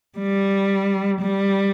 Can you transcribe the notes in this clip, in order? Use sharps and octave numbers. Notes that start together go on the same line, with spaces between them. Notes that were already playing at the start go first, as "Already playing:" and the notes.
G3
G3